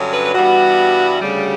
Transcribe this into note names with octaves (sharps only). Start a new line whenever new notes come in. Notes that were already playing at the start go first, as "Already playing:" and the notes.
Already playing: G2 D3 F#3 C#4
B4
B4
G2 E3 G3 B3 F#4
D2 C#3 G3